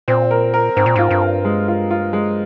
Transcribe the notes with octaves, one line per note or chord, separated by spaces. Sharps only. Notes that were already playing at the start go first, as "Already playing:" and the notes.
A#2 C4
A#4
A#4
G#2 C4
A#2
G#2 F4
G2
A#4
G#3
F4
F4
G#3